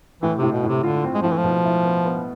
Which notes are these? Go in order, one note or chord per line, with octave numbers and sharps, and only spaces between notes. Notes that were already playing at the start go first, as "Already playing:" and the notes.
A2 E3
A2 C3
B2
A2
C3
D3 F4
C4
G#3
A2 F3
E3
F3
B2
E4
B3
B3